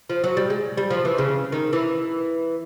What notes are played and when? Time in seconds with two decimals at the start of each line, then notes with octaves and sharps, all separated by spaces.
0.10 F3
0.24 F#3
0.37 G3
0.50 G#3
0.77 G3
0.90 F3
1.05 E3
1.18 C#3
1.52 D#3
1.73 E3